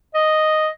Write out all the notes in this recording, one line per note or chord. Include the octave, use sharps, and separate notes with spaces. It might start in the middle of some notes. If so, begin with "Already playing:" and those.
D#5